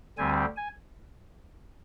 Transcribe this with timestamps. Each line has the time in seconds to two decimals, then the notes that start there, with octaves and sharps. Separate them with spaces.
0.18 D2 D3 G3 C4 G#5
0.57 G#5